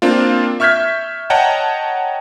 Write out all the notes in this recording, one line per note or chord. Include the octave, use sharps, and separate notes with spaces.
A#3 C4 D4 F4
E5 C#6 F6 G6 G#6 B6
C#5 D#5 F#5 G5 A5 A#5